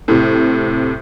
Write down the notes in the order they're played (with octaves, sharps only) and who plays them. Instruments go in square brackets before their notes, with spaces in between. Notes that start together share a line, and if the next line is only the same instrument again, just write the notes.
[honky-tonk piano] A2 C3